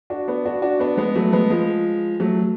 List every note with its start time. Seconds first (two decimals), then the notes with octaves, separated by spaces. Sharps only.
0.10 D4 F#4
0.28 B3 D4
0.45 D4 F#4
0.62 D4 F#4
0.80 B3 D4
0.97 G#3 B3
1.15 F#3 A3
1.33 G#3 B3
1.50 F3 G#3
2.20 F#3 A3